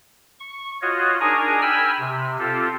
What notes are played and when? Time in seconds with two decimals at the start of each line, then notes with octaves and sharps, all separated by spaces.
0.40 C#6
0.82 F4 F#4 C#5 D#5
1.20 D4 D#4 G#4 A#4 G#5 A#5
1.62 G5 G#5 B5 E6 F6
1.99 C3
2.38 C4 F4 G4 A4